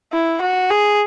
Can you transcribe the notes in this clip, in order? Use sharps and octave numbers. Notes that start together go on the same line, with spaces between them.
E4
F#4
G#4